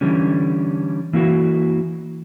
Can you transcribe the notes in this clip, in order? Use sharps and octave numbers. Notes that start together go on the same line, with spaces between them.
D3 E3 G3 C#4
E3 A#3 E4 F#4